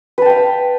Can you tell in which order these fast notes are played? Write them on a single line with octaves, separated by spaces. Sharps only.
B4 A5 G5 F5